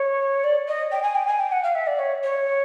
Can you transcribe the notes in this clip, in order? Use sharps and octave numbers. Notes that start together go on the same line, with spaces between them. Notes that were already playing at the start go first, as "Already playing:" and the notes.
Already playing: C#5
D5
D#5
G5
G#5
G5
G#5
G5
F#5
F5
E5
D5
C#5
C#5